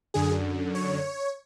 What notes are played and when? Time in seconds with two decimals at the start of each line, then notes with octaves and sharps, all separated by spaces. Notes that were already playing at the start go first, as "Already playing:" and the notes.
0.14 F#2 D3 G#4
0.75 C#5